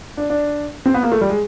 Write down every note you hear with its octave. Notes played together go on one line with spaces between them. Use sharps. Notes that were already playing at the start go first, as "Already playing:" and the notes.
D4
D4
C4
B3
A#3
A3
G3
G#3